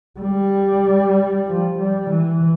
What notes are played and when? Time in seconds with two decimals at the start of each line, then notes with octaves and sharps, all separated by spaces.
0.20 G3
1.47 F3
1.79 G3
2.10 E3